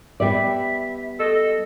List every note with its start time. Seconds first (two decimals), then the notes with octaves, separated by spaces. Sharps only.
0.20 G3 B3 D5 E5
1.19 A4 D#5